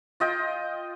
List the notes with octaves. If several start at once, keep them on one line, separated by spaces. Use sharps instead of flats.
F4 D#5 G5